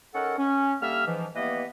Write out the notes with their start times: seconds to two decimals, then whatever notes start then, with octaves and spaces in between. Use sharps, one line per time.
0.15 D#3 C#4 A4 A#4 F#5
0.38 C#4
0.82 D3 G3 A#3 E5 F6
1.06 G#2 E3 F3
1.36 E3 G3 A#3 B3 B4 D#5